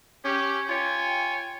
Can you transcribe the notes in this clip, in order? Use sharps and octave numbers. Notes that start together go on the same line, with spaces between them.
C#4 G4
F4 C#5 G5 G#5